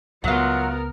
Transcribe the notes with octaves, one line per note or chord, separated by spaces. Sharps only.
C#2 F#3 B3 F4 A#4 F#5